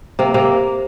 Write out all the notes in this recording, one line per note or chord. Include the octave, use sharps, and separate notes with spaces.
C3 A#3
C3 A#3